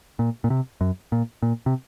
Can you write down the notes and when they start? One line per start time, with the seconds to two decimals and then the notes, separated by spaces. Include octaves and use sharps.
0.19 A#2
0.44 A#2
0.50 C3
0.81 F#2
1.12 A#2
1.42 A#2
1.66 C3